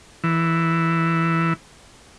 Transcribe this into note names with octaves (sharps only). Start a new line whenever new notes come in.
E3